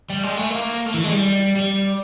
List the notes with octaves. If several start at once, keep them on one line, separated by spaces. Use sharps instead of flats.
G3
G#3
A3
A#3
A3
E3
G#3
G3
G3